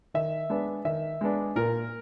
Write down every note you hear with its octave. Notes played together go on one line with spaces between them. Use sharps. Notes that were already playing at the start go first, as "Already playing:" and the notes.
D#3 E5
G#3 B3 D4
D#3 E5
G#3 B3 D4
A#2 A#4